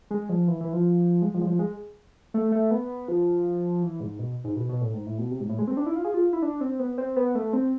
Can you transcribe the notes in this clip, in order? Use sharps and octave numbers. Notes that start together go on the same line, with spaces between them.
G#3
F3
E3
E3
F3
G#3
F3
G#3
F3
G#3
A3
A3
B3
F3
E3
G#2
B2
G#2
B2
B2
A2
G#2
A2
B2
C3
G#2
A2
G#3
C4
D4
E4
F4
G#4
F4
E4
D4
C4
B3
C4
B3
A3
C4